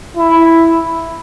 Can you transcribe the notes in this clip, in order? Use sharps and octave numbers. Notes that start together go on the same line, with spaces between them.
E4